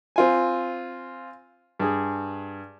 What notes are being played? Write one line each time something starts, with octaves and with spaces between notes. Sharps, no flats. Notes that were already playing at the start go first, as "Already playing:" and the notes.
C4 F4 G#5
G2 G#4